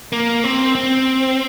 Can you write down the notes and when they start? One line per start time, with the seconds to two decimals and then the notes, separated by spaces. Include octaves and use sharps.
0.12 A#3
0.44 C4
0.75 C4